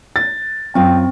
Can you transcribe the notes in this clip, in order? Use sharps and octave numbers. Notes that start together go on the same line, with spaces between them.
A6
F#2 C4 F4 G5